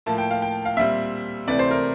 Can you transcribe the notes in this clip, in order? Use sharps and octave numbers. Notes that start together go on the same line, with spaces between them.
A2 F3 A#3 A5
G5
F5
G5
F5
A#2 G3 C4 E5
C3 E3 A3 D5
C5
A#4